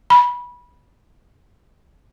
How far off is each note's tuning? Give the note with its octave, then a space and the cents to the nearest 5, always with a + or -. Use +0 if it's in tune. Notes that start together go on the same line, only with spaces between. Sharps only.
B5 -20